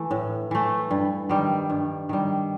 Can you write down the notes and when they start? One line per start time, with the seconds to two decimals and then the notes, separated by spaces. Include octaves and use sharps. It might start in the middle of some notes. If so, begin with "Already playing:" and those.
Already playing: E3 A3
0.11 A2
0.51 E3 A3
0.91 G2
1.29 D#3 G3
1.70 G2
2.09 D#3 G3